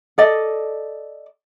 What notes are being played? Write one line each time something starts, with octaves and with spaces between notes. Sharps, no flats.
A4 D5 D#5